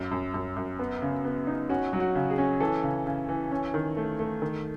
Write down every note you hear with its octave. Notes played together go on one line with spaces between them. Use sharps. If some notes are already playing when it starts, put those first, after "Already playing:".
Already playing: F#2
F#2
F#2
F#2
B3
C#3
B3
D#4
C#4 F#4
F#3
F#4
C#3
G#4
C#4
E3 A4
C#3
C#3
E3
C#4
D#3
A3
A3
D#3